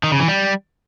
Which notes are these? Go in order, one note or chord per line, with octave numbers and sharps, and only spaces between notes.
D#3
C#3
E3
G3